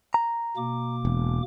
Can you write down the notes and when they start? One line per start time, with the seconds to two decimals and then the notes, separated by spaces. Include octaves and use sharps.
0.14 A#5
0.57 B2 A#3 D6
1.05 E1